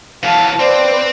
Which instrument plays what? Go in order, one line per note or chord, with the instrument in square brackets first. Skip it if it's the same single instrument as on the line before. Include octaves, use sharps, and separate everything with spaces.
[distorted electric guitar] E3 F#3 [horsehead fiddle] F5 A5
[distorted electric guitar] C4 [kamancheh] B4 D5 [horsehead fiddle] C5